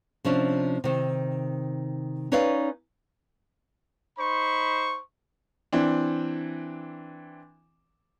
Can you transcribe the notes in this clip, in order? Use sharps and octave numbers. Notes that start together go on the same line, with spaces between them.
C3 F3 C#4 D4
C3 D#3
C#4 D#4 B4 C#5 D5 F5
D#4 C5 B5 C#6
E3 C4 D4